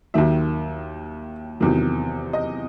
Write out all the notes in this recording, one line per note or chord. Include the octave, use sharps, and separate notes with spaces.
D#2 D#3 F#3 E5
E2 C3 D#3 F#3
D#5